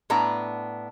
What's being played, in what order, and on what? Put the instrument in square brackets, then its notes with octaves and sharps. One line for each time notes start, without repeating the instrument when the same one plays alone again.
[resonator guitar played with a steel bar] A2 B3 D4 A#5